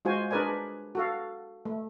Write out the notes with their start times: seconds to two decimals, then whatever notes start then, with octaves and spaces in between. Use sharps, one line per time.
0.05 G#3 F4 F#4 C5 G#5
0.31 D4 G#4 A#4 B4 D5 G#5
0.95 F#4 A4 F5
1.65 A3